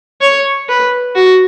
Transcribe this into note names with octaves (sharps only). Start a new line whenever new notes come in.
C#5
B4
F#4